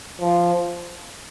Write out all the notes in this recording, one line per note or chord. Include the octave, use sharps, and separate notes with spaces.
F3